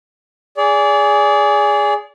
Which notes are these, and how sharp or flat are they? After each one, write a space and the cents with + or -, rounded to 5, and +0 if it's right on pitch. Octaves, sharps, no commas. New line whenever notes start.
G#4 -5 D5 -30